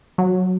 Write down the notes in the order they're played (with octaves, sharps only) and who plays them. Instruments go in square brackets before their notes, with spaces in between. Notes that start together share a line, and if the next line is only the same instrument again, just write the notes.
[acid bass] F#3